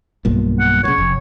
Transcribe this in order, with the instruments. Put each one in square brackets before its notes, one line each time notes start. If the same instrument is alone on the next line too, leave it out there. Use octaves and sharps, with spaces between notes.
[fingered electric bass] B1 G2 A#2
[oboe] F#5
[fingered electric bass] A#2 C#3 [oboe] C#5
[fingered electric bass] F1